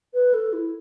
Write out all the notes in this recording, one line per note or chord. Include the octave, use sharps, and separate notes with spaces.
B4
A4
E4